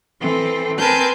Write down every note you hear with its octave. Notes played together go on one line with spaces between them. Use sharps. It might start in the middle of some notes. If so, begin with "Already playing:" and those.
E3 C4 A4
C4 A#4 B4 G#5 A5 G6